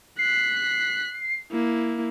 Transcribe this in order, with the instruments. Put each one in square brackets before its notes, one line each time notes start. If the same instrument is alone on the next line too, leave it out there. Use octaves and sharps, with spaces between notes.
[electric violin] F#6 B6 [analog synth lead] C7
[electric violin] A#3 E4